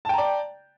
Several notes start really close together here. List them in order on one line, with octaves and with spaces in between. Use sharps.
A5 G5 A#5 D5